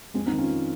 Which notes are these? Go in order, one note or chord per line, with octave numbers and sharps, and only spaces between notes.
F2 G#3 C4
C4 D#4
D#3
C#4 F4
F2